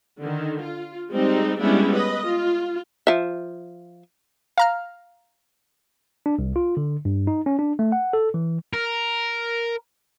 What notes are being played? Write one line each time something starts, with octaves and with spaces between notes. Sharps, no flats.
D3 D#3
F4
G3 G#3 C4 D#4
G3 G#3 B3 C#4 D4 E4
B4 D#5
F4
F3 E5
F5 A#5 F6
D4
C2
F4
D3
G2
D#4
C#4
D4
A3
F#5
A4
E3
A#4